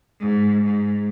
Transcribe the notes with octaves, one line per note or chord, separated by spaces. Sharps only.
G#2
G#2